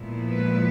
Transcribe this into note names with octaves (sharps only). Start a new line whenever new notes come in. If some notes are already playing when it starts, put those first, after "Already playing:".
Already playing: A#2 F3 G#3 B3 E4
B4